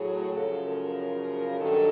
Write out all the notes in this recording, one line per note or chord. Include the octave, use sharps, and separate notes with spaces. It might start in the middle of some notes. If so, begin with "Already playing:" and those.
Already playing: A2 F#3 G#4
F#2 C#3 F3 A4
A#4
G2 D#3 F#3 A4